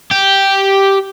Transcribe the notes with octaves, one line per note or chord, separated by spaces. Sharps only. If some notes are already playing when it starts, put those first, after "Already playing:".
G4